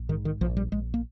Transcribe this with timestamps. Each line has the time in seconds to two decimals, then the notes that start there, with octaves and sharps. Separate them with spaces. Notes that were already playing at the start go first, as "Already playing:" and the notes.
Already playing: A#1
0.09 G#2 D#3
0.25 D#3
0.41 A#1 F3
0.57 G3
0.72 A#1 G#3
0.94 A#3